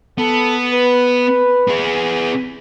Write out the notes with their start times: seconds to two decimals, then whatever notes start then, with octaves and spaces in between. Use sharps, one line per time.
0.18 B3 A4
0.74 B4
1.68 B3 G#4